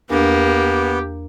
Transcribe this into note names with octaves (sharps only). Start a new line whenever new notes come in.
E2 A#3 B3 D4 G4